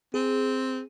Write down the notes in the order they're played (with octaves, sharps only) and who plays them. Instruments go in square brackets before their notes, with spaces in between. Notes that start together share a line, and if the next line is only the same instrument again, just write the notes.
[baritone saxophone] C4 [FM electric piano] G#4